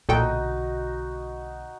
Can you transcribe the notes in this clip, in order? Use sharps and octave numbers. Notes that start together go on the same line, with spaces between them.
B1 A#2 D3 D#4 F#4 A4 G5